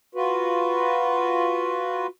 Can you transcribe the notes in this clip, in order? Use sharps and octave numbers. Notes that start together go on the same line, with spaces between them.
F4 F#4 B4